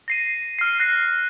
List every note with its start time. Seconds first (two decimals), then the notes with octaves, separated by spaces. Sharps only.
0.08 A#6 C7 D#7
0.59 F6 C7
0.79 F#6 A#6 C7